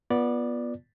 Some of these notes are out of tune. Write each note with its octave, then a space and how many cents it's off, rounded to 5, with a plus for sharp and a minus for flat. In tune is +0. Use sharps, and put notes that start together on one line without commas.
B3 -20 F4 +0 D5 +0